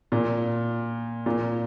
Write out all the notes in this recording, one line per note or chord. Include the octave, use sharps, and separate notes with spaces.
A#2
A#2